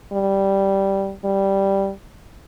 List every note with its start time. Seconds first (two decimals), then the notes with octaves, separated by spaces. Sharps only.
0.13 G3
1.24 G3